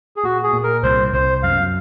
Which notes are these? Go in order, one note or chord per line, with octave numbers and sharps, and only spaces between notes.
G#4
A#2 F#4
G#4
A#2
A#4
C2 C5
C2 C5
F#2 F5